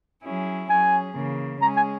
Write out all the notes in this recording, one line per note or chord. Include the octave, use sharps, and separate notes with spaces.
F#3 C#4 E4 G#4
F#3 C#4 G#4 G#5
C#3 E3 A#3
G#3 C#4 G#4 A#5
G#5